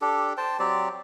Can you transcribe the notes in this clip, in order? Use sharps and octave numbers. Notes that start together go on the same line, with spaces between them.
D4 G4 A4
C5 G5 A5
F#3 C4 G4 D5